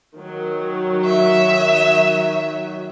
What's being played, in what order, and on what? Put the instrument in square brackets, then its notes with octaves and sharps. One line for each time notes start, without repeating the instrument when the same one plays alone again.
[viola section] D#3 F#3
[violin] E5